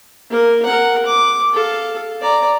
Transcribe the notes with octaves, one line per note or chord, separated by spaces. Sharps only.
A#3 A#4
A#4 F#5
D6
A4 F5
D5 A#5